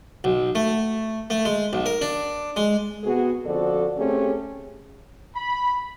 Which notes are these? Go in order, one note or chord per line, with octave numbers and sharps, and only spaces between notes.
B1
A3
A3
G#3
B1
A#4
D4
G#3
C3 B3 F#4 G#4
F2 D3 F3 F#4 A4 D5
A3 C4 C#4 G4 G#4
B5